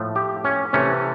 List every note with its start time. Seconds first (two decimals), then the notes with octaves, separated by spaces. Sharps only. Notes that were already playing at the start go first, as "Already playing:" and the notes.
Already playing: A2 F3 A3
0.16 G4
0.45 C#4
0.73 C3 E3 A3 C#4